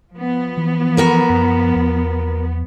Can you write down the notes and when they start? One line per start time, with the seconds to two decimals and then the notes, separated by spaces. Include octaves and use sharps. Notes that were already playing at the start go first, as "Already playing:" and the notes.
0.14 F3 B3
0.57 E3
0.97 F#4 A#4 B4
1.30 F#2
1.76 E2